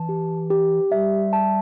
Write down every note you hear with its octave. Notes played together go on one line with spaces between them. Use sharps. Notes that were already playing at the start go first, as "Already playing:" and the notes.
Already playing: E3 A5
G4
G4
G3 E5
A5